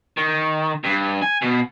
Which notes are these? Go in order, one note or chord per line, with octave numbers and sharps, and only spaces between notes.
D#3
G2
G#5
B2